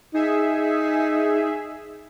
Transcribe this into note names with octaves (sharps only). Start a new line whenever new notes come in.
D#4 G#4 E5